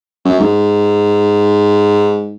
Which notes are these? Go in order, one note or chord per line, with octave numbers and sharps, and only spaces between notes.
F#2
G#2